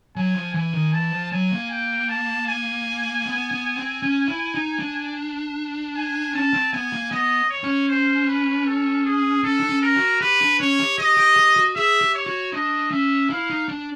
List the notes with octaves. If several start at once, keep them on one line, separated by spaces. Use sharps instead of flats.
F#3 G#5
F3
E3 G#5
D#3
E3 A5
F3
F#3 G#5
A#3
G5
A5
G#5
B3
B3
C4
C#4
E4
D#4
D4
G#5
C#4 A5
C4
B3 G#5
A#3
B3 D#5
C#5
C#4
C5
B4
A4
G#4
C#4 A4
D4
C#4
A#4
F#4
G4 B4
D4
C#4 C#5
G4
G4 D#5
G4
G4
F#4
G#4 E5
G4
C#5
F#4
D4 D#5
C#4 E5
E4 F5
D#4
D4